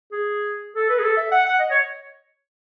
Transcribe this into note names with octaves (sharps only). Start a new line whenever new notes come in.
G#4
A4
B4
G#4
A4
E5
F#5
F#5
D#5
C#5